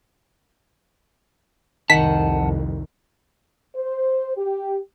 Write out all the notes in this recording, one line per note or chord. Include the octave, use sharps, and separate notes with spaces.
C2 F2 D#3 F#5 A5 B6
C5
G4